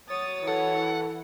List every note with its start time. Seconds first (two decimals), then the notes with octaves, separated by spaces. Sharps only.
0.10 F#3 C#5 D#6 A6
0.47 E3 A4 F#5